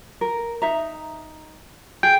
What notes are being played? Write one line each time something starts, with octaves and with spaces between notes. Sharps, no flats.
A#4
D#4 E5 A#5
G#4 G5